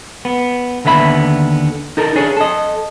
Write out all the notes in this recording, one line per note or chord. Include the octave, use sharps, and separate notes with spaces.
B3
D#2 D3 B3 E5 B5
D#4 A4 A#4
D4 G#4 C#5
A4 D#5